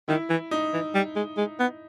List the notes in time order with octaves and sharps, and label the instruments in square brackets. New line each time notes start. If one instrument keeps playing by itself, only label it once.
[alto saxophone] D#3 [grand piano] E4
[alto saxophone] E3
[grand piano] D#4
[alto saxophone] E3
G3
G#3
G#3
B3